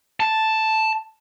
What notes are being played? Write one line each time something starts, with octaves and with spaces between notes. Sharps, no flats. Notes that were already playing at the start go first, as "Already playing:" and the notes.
A5